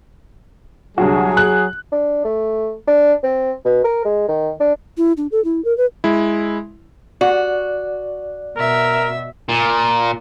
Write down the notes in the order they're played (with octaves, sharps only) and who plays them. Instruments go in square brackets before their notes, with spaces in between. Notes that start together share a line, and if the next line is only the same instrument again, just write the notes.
[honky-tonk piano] C2 D3 F#4 [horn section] F#3 G#4
[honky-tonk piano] F#6
[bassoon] D4
A3
D4
C4
B2
A#4
G#3
D#3
D4
[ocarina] E4
D4
A4
E4
A#4
B4
[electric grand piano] G#3 E4
[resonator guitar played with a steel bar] F#4 [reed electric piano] D5
[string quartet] B2 E5 [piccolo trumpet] A#4
[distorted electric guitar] A#2